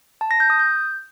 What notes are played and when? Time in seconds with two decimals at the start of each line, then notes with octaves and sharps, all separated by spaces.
0.21 A5
0.31 A#6
0.40 G6
0.50 D#6
0.59 G6